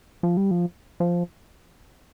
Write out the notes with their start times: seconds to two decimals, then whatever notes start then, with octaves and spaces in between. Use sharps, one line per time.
0.23 F3
0.37 G3
0.51 F3
1.00 F3